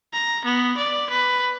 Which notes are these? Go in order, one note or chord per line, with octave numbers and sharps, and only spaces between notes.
A#5
B3
D5
B4